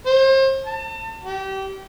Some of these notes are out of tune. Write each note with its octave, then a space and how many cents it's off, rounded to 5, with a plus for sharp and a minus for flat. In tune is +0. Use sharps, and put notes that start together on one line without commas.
C5 +35
A5 +35
G4 -25